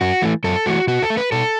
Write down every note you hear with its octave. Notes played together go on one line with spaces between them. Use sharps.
F#2 F#4
E3 A3
F#2 A4
E3 A3 F#4
B2 F#4
A4
A3
B4
B2 A4